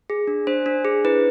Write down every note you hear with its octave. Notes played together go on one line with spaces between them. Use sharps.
G#4
D4
D4 C5
D4
G#4
E4 B4